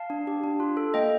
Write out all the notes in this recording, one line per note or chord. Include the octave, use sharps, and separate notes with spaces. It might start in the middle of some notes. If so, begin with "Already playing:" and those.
Already playing: F5 A5
D4
G4
D4
F4
A4
A#3 D#5 G5